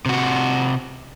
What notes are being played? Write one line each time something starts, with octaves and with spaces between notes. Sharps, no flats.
C3 F#4